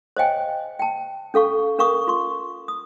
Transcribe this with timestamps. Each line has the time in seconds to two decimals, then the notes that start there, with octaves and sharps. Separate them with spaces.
0.17 C5 C#5 D#5 F5 G5 G#5
0.79 G5 A5
1.34 C#4 A4 F5 C#6
1.78 C#4 A#4 F5 C#6 D#6
2.07 F4 C6 C#6
2.68 D#6